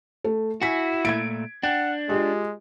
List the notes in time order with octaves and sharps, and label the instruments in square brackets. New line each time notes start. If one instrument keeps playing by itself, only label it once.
[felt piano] A3
[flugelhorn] E4 [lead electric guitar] F#4 [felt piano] G#5 B6
[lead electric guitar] A#2 A3 [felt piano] G#6 D7
[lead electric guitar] D4 [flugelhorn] F#5 [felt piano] G5
[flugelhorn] G#3 [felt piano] F4 G4